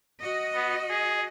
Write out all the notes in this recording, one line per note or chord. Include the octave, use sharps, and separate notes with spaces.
F#4 D#5
B3
G#4